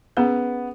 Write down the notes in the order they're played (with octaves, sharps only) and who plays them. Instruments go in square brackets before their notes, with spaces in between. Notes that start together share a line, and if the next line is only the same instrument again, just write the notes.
[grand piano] B3 [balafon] C#4 G#4 B4